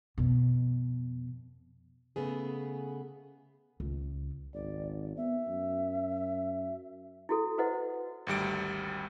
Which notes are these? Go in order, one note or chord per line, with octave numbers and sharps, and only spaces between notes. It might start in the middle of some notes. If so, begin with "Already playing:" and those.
F2 B2
C#3 A3 B3 G#4
C#2
G#1 D5
B3 E5
F#2
E4 F#4 A4
E4 F#4 B4 C5 D#5 F#5
G#1 D2 G3 D7